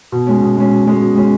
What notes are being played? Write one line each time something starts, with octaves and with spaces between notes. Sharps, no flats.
B2
G#3 C#4
B2
G#3 C#4
B2
G#3 C#4
B2
G#3 C#4